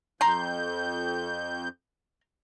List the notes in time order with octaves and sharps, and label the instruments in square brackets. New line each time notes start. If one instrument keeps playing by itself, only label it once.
[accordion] F2 G6 [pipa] A#5 C6